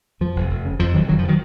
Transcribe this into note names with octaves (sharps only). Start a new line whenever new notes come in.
F2 F3
F1
F1
C#3
F2 F3
F1 D#3 F#3
F1 D#3 F#3
F3
C#3
D#3 F#3